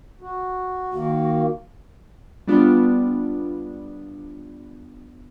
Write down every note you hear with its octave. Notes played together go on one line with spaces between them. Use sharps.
F#4
D#3 A#3 F#4
G3 B3 D4 F4